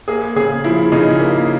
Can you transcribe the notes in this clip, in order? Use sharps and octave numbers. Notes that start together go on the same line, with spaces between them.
A#3 G#4
C#3 G#4
F3 E4
C#3 D#4
A#3